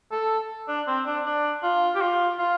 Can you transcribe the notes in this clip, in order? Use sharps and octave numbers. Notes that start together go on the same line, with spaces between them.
A4
D4
C4
D4
D4
F4
G4
F4
F4